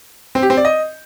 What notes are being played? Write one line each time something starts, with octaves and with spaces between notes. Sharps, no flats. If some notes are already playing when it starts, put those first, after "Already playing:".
C4
G4
C4
D5
D#5